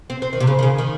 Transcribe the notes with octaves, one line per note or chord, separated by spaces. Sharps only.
C4
C4
D#3
C3
C#3
D#3
C#3
D#3